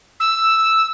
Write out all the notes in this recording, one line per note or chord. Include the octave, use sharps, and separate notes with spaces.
E6